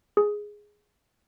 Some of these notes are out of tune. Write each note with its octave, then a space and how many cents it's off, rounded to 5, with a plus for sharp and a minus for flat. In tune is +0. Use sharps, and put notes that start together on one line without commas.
G#4 +0